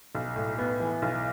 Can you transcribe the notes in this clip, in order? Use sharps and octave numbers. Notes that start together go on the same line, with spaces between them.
B1
A2
B3
E3
B1